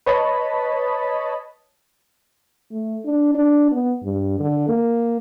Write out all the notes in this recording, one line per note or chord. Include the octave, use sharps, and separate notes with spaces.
B4 C#5 D#5 A5 B5
A3
D4
D4
B3
G2
D3
A#3